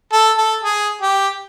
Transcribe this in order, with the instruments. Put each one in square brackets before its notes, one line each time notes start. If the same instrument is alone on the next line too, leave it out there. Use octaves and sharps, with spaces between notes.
[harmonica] A4
A4
G#4
G4